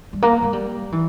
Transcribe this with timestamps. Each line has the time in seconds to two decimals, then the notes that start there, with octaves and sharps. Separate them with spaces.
0.13 G3
0.22 A#3
0.43 G#3
0.53 G3
0.92 E3